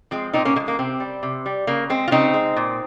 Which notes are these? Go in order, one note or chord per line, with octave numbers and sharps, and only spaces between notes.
F3 G#3 C4
A#2 C4 D#4
A#3 C#4
F3 G#3 A#3
A#3
C3 C4
G3
C3
G3
C#3 A#3
G#3 C4
F4
C#3 C4 D#4
G#3
A#2